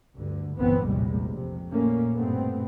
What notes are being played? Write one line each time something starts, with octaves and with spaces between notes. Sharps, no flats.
D2 G2 D3
G1 C#2 A#2 E3 B3 C4
A#1 E2 A2 C3 G3 G#3
F2 C3
A#2 A3 A#3 C#4
G2 B2 A3 B3 C4